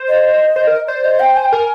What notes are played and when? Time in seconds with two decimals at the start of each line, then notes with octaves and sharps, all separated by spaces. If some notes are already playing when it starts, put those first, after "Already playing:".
Already playing: C5
0.08 D#5
0.56 C5
0.67 A#4
0.87 C5 D5
1.04 D#5
1.20 G5
1.36 G#5
1.44 G5
1.52 A#4 G#5